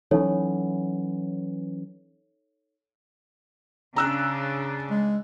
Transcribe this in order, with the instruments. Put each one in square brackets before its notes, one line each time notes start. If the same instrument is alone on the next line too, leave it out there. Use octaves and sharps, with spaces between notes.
[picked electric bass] E3 F#3 C#4 [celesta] D#4 A4 C#5
[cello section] C#3 D4 [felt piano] A#5 E6 F#6
[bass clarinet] G#3